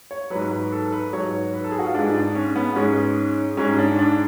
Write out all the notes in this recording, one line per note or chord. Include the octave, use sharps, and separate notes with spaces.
C#5
G#2 F#3 B4
B4
A4
B4
G#2 F#3 C#5
B4
A4
G#4
F#4
F4
G#2 G#3 D4
D4
C#4
B3
G#2 G#3 C#4
G#2 G#3 C#4
D4
D4